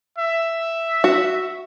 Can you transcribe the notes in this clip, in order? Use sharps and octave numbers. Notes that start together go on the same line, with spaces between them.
E5
F#4